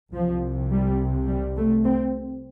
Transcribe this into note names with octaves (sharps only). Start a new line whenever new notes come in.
C2 C3 F3
G3
G3
A3
C4